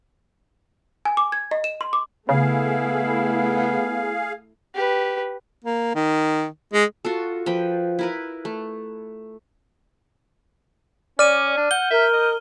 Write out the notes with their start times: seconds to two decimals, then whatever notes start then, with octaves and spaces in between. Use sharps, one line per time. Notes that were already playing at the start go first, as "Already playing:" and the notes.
1.05 G#5
1.17 D6
1.32 G#6
1.51 D#5
1.64 E7
1.81 C6
1.93 D6
2.29 C#3 A3 B3 E4 G#4 F5
4.75 G4 B4
5.64 A#3
5.95 D#3
6.73 G#3
7.05 F4 F#4 A4
7.46 F3 B4 G5
7.99 E4 A#4 B4
8.45 A3
11.19 C#4 D5 F6 D#7
11.57 D4
11.71 F#5 G6 G7
11.91 A#4 E5
12.13 D#5